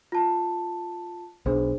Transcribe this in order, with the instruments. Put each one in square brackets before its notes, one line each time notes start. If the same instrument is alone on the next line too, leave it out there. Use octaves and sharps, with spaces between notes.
[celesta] F4 A5
[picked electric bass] B1 [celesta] D4 G#4 C5